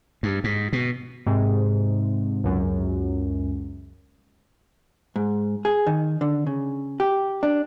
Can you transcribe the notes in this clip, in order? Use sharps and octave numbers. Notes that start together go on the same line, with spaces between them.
G2
G#2
B2
G#2 C3
C#2 F#2
G#2
G#4
D#3
D3
C#3
G4
D4